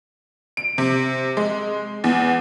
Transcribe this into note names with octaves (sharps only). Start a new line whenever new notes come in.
D7
C3
G#3
E2